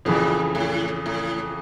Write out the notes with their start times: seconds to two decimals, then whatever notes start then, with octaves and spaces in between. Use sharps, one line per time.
0.05 F2 A#2 C#3 E3
0.55 A2
1.06 A2